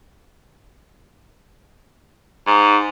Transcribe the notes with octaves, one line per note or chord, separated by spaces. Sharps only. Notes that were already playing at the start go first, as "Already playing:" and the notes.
G#2